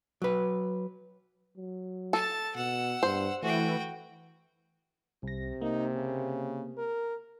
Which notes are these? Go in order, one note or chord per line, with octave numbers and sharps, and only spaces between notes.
F#3 B4
F#3
A4 A5
B2 F#5 E6
G2 C5
E3 A3 F#4 G5
C2 C3 A#6
A#3 D#4
C#3
A#4